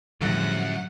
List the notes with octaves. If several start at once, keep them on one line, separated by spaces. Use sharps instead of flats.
F#2 A2 D3 F3 G3 G#3 F#5